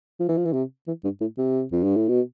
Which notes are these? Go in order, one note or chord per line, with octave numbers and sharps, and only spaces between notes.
F3
E3
F3
E3
C3
E3
G2
A2
C3
F2
G2
A2
B2